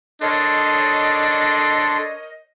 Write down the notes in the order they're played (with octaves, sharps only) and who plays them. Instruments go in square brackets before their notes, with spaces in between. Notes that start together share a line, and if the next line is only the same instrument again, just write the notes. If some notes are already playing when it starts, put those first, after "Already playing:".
[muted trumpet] D4 [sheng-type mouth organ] A4 C6 [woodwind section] A#4 C#5 D#5